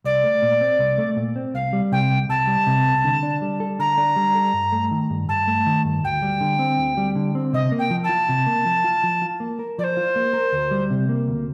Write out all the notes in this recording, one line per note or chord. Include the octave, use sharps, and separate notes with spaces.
C2 D5
A3
A#2
C4
C2
A3
A#2
C4
C2 F5
G3
C3 G5
C2
C2 A5
G3
C3
C2
D3
D4
G3
A4
D3 A#5
D4
G3
A4
G2
A3
D#3
G2
G2 A5
A3
D#3
G2
D2 G5
G3
D3
C4
D2
G3
D3
C4
C3 D#5
A#3
G5
F3
A5
F4
C3
A#3
F3
F4
F3
F4
A#3
A#4
F3 C5 D5
F4
A#3
A#4
D2
G3
C3
A#3
D2